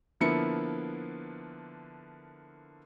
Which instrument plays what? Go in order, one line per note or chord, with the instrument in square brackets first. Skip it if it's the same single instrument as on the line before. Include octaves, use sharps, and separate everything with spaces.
[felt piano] D3 F3 A#3 B3 E4 C#7